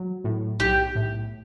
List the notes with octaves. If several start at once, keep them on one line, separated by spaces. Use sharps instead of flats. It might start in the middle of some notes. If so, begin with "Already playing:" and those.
Already playing: F#3
A2
B1 G4
A2